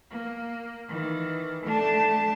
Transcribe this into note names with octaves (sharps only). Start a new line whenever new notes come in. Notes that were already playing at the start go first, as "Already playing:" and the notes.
A#3
D#3 E3
A3 D4 A5